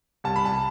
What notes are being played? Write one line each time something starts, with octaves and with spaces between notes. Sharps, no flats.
C2 A5
B5
A5